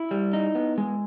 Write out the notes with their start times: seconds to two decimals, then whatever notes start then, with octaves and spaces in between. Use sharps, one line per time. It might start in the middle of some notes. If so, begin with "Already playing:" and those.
Already playing: E4
0.11 G3
0.33 D#4
0.55 B3
0.78 G#3